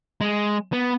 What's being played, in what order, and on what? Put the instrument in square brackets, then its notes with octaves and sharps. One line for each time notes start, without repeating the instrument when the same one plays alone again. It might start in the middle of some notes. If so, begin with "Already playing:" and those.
[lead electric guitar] G#3
B3